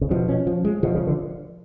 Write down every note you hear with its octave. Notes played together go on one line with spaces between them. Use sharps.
C#3
B2 F3
C#4
F3
G#3
B2 F3
C#3
D3